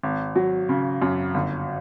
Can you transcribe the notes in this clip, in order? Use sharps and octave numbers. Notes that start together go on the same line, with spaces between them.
G#1
F#3
C#3
F#2
G1